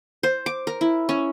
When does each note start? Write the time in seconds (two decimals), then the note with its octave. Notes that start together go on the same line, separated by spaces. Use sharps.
0.23 C5
0.46 D6
0.67 A#4
0.81 E4
1.09 C#4